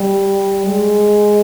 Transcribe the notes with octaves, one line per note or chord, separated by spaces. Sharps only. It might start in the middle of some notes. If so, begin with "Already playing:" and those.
Already playing: G3
G#3